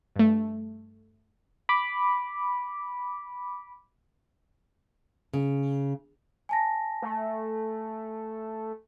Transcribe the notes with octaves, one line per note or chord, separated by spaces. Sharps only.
G2 A3
B5 D6
C#3
G#5 A5 A#6
A3